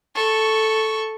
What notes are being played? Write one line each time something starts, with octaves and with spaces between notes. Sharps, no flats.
A4 C#6